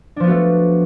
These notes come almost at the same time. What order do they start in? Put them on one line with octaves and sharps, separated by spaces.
D4 F3 B3 F#4 A3